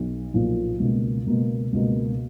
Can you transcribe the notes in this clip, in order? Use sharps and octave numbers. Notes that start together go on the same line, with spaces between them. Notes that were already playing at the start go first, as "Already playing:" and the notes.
Already playing: B1
B1 A#2 F3
C#2 B2 A#3
C#2 B2 A#3
C#2 B2 A#3